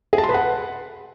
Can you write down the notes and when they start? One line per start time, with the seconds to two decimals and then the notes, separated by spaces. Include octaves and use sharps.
0.13 G#4
0.18 A5
0.24 C6
0.29 B4
0.34 F#5